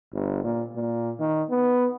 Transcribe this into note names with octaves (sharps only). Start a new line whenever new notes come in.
G1
A#2
A#2
D#3
B3